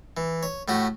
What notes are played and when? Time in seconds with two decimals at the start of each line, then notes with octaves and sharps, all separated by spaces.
0.17 E3
0.43 C#5
0.68 A2 A3 F#4 G4